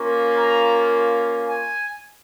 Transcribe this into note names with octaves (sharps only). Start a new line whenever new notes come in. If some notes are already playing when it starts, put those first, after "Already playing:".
Already playing: A#3 C#4 F4
A#5
G#5